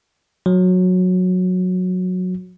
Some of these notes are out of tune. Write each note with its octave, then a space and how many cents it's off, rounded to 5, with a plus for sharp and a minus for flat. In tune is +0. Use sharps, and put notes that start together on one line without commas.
F#3 -15